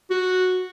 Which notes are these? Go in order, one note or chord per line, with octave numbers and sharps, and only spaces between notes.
F#4